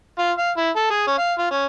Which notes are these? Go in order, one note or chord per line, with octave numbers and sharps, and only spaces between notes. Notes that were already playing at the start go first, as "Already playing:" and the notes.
F4
F5
E4
A4
G#4
C#4
F5
F4
C#4